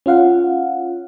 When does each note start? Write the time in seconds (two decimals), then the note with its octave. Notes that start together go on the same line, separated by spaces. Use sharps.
0.06 C#4 F4 F5 F#5